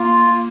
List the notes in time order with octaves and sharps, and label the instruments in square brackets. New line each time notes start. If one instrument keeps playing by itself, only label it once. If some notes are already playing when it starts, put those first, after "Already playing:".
Already playing: [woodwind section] A#3 [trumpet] F4
[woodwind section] A#3